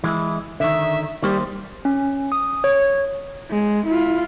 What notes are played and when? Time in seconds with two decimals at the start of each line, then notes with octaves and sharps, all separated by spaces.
0.04 E3 G#3 E4
0.60 D3 D#3 E5
1.23 D#3 G3 A#3 C5
1.85 C#4
2.32 D#6
2.64 C#5
3.51 G#3
3.88 E4 F4